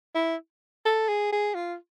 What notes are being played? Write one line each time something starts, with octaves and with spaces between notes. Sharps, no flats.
E4
A4
G#4
G#4
F4